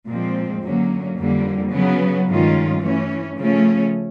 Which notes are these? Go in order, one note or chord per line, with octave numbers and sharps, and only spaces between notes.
A#2 F3 G#3 C4
F#2 D3 F#3 A#3 C#4
F2 D3 G3 A#3
C#3 F#3 B3
G2 D#3 G#3 C#4 F4
E3 A3 C#4
C#3 F3 A3 C#4